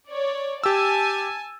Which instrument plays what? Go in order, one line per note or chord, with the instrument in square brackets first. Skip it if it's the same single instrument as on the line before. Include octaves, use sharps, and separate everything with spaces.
[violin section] C#5 D5
[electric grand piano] G4 E6 [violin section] G#5 A5